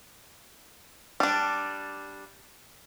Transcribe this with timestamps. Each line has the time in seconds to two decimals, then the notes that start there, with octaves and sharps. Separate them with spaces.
1.20 G3 D4